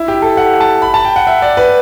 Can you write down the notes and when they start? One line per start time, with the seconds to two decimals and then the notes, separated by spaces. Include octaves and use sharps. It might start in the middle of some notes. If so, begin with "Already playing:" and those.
Already playing: E4
0.08 G4
0.22 A4
0.37 F#5
0.60 A5
0.82 B5
0.94 A5
1.05 G5
1.16 F#5
1.27 E5
1.42 D5
1.57 B4